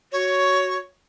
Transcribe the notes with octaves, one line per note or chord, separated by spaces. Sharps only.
F#4 C#5